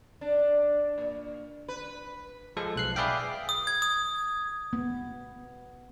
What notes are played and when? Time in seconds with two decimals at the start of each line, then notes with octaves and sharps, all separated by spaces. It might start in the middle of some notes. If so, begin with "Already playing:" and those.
0.21 D4
0.98 A#2
1.68 B4
2.57 F3 G#3 A4
2.76 B1 F#6 C7
2.96 G#4 B4 D5 E5 F5 G5
3.49 D#6
3.67 G#6
3.82 D#6
4.73 B3